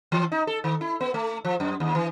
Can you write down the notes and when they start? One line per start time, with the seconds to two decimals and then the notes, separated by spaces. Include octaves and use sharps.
0.12 E3
0.32 D#4
0.47 A4
0.64 D#3
0.81 E4
1.01 B3
1.14 A3
1.45 F3
1.60 F#2
1.80 D#2
1.95 E3